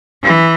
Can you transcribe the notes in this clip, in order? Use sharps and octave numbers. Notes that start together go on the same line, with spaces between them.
E3